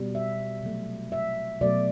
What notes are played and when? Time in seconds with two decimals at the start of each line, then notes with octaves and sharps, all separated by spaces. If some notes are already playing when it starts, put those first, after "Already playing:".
Already playing: B2 G3
0.15 E5
0.63 C3 F#3 A3
1.12 E5
1.61 B2 F#3 A3 D5